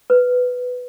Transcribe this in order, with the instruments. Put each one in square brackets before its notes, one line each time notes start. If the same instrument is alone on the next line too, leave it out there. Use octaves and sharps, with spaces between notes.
[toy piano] B4